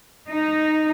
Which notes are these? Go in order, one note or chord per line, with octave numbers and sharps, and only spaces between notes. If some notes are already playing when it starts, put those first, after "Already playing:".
D#4